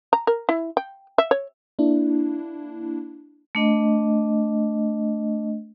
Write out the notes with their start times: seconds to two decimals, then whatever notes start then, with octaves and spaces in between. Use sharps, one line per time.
0.13 A#5
0.27 A#4
0.49 E4
0.77 G5
1.18 E5
1.31 C#5
1.79 A#3 D4 E4
3.55 A3 D4 D#5